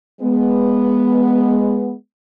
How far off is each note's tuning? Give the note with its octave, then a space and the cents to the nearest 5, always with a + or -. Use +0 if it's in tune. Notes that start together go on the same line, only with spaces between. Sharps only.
G#3 +0 B3 +0